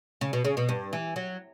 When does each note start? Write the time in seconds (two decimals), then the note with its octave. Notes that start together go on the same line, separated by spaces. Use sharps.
0.21 C#3
0.33 B2
0.45 C#3
0.57 B2
0.69 G2
0.93 E3
1.16 F#3